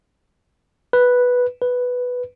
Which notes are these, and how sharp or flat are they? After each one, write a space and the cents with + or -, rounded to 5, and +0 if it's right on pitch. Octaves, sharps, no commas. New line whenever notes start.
B4 -5
B4 +0